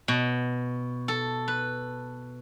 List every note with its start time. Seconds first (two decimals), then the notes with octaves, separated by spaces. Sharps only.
0.08 B2
1.08 A4
1.48 B4